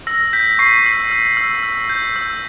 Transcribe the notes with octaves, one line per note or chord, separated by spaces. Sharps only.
E6 A#6
G6 B6
C#6 C7
E6
E6
E6
E6
G6
E6